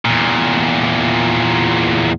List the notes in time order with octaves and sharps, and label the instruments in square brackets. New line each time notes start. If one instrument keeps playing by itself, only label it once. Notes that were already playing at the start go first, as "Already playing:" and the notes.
[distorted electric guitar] E2 A#2